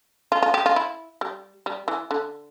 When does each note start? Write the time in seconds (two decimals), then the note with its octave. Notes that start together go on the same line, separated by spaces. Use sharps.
0.32 F4
0.42 F4
0.54 G4
0.66 F4
0.76 E4
1.21 G3
1.66 G3
1.88 E3
2.11 D3